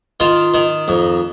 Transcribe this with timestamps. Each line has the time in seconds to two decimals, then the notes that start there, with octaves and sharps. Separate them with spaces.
0.20 D#3 F4
0.54 D#3
0.88 F2